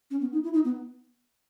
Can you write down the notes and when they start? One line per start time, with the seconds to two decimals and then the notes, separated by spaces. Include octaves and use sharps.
0.11 C#4
0.21 B3
0.32 D#4
0.44 E4
0.53 D#4
0.65 B3